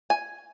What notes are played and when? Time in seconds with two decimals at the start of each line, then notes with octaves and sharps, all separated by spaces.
0.10 G#5